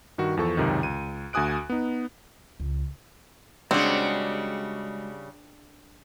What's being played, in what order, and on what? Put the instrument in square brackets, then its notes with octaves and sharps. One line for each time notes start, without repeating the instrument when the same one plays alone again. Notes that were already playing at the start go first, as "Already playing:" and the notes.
[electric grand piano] G2 D#3 F#4
E2 F3 A4 C#6
C#2 F#2 C3 D#3
C#2 D#7
D2 F#4 G#5 D#6 F#6 D7
B3 D#4
[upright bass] C#2
[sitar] C#3 G3 [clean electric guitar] G#3 F#4 [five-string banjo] C4 [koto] D4 G#4